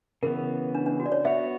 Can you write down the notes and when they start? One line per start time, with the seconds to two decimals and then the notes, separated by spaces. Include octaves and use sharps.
0.23 C#3 E3 B3 A#4
0.75 D4
0.86 D4
1.00 F#4
1.06 D5
1.12 C#5
1.25 B3 F#4 C#5 E5